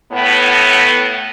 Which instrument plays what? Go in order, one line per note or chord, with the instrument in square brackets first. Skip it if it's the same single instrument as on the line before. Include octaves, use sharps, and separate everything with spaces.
[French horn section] A2 B3